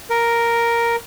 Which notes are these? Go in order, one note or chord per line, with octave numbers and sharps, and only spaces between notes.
A#4